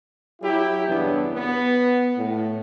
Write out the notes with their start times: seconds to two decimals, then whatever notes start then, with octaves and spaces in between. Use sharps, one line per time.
0.42 F#3 E4 G4
0.87 E2 G2 C#3 E3 B3 D4
1.33 B3
2.17 A2